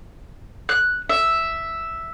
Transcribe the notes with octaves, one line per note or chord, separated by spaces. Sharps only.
F#6
E5